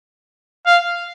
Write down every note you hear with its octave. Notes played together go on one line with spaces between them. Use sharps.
F5